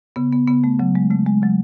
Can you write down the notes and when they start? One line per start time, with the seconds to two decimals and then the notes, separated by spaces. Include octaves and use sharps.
0.16 C#3 B3
0.32 B3
0.48 C#3 B3
0.64 A3
0.80 C#3 F#3
0.95 G#3
1.11 C#3 A3
1.27 G#3
1.42 C#3 F#3